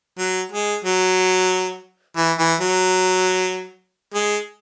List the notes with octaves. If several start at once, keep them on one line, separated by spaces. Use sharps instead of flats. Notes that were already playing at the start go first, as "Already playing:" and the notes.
F#3
G#3
F#3
E3
E3
F#3
G#3